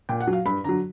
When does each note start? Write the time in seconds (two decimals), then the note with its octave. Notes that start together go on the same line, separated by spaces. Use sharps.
0.09 A#2 G5
0.21 F#5
0.27 F#3
0.33 F5
0.46 G2 B5
0.64 D3 F#3 A#5